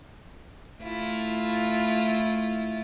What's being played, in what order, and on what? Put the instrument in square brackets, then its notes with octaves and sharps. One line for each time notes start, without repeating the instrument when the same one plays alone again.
[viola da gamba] A3 E4 F4